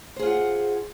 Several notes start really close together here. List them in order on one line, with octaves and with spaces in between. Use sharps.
C5 G#4 F4 F#5